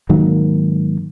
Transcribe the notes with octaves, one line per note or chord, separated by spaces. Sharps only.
G#2 D#3 F#3 A#3